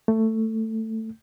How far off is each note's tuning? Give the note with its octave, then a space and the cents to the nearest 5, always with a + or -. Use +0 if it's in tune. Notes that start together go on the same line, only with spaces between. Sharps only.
A3 +15